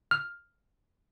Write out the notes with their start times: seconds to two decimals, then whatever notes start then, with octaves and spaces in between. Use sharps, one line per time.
0.11 F6